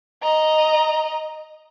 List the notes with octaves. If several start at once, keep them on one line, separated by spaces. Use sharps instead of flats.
D#5 A#5